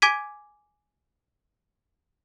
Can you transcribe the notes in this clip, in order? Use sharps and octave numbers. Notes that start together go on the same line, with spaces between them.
G#5 D6 G#6 B6 D#7